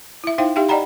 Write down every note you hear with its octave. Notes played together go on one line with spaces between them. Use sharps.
E4 E5
D#4 E4 C5 E5 F5 G5
D#4 G4 E5 F5 G5
D5 D#5 F#5 G5 A#5 B5